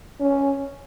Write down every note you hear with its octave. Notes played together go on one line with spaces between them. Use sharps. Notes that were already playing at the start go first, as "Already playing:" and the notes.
C#4